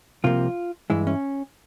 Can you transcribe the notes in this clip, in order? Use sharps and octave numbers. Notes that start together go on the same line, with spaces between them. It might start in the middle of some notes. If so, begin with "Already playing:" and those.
C2 C3 F3 A#3 F4
G2 E3 G#3 E4
C#4